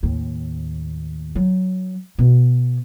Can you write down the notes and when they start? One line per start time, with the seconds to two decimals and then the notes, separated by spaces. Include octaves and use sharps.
0.03 D#2 A2
1.36 F#3
2.18 B2